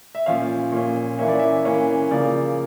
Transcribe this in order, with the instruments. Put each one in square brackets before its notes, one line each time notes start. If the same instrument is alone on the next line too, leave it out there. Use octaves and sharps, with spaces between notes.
[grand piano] E5
A#2 F3 C#4 F5
A#2 F3 C#4
E3 A#3 C#4 E5
D5
E5
E3 A#3 C#4
C#3 F3 A#3 D5